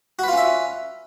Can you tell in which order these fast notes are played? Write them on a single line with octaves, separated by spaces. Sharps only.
F#4 B4 F4 C#4 E5